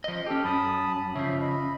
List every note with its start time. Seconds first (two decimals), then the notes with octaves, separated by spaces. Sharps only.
0.04 F3 D#5
0.26 C#4 G4 A4
0.44 F#2 A5 B5 D#6
1.15 C#3 F3 E5
1.41 D#5 B5